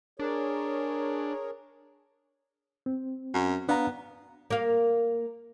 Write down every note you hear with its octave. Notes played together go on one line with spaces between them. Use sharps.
D4 G#4 A#4 C#5
C4
F#2
B3 D4 F5 A#5
A#3 F5